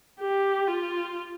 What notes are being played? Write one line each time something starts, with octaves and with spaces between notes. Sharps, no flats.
G4
F4